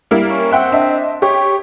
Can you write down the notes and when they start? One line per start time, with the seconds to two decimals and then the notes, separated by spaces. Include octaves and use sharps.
0.11 G3 A#3 E4
0.30 C#4
0.51 C4 E5 F#5 G5
0.72 D4 D#5 E5
1.22 G4 C#5